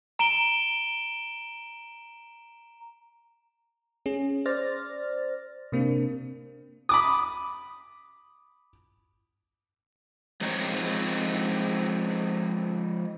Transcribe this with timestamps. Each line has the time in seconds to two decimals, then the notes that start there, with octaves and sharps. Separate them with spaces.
0.19 A#5 D7 E7 G7
4.06 C#4 G#4
4.46 C5 D5 F6 A6 A#6
5.72 C3 A#3 C4 D4
6.89 B5 D6 D#6
10.41 F3 G#3 C4 D#4 C#5